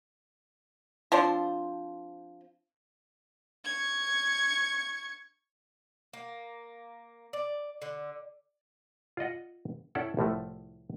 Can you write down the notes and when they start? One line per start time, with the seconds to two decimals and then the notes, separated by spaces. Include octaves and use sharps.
1.12 F3 C4 D4 C5
3.65 C#6 G#6
6.13 A#3
7.33 D5
7.82 D3
9.17 F4 D5 D#5 F#5
9.95 C#4 E4 A4 D5 F#5 G5
10.17 C2 A2 F3 A3